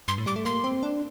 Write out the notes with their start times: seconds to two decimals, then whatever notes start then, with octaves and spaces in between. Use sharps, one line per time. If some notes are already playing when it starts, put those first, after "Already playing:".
0.08 G2 C6
0.18 A2
0.26 G3 D6
0.36 A3
0.45 A#3 C6
0.64 C4
0.83 D4